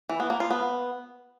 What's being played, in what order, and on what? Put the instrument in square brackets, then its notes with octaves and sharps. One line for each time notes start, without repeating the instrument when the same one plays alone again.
[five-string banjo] E3
B3
A#3
F4
B3